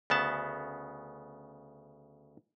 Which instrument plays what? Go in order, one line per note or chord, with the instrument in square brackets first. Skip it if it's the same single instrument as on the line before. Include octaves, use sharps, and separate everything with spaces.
[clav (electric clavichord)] D2 C#3 B3 A5